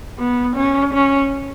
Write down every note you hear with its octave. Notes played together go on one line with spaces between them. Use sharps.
B3
C#4
C#4